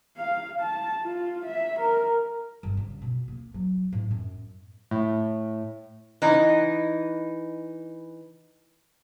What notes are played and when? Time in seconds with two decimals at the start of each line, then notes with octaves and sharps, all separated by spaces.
0.17 F5
0.61 A5
1.03 F4
1.46 E5
1.80 A#4
2.63 G1
2.77 C#3
3.02 B2
3.28 A#3
3.54 F#3
3.92 A2
4.11 F#2
4.91 A2
6.22 E3 D#4